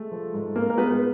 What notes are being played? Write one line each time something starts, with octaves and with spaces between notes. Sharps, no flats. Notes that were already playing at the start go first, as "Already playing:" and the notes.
Already playing: G#3 A3 A4
F3
G#2
G#2 A#3 A#4
A#4
G#3 B3 B4
B4